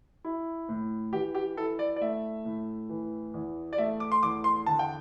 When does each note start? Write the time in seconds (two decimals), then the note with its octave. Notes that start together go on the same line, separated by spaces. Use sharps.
0.25 E4
0.69 A2
1.12 E3 G4
1.35 G4
1.57 E4 A4
1.79 D5
1.96 D5
2.01 A3 E5
2.45 A2
2.89 E3
3.34 E2
3.73 D5
3.78 A3 E5
4.00 D6
4.12 C6
4.23 E2 D6
4.44 C6
4.66 D3 A5
4.79 G5